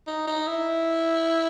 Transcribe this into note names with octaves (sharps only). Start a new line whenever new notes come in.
D#4
D#4
E4